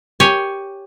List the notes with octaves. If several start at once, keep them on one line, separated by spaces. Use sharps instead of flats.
G4 C#5 G#5